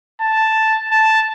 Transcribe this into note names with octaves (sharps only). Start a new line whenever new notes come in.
A5
A5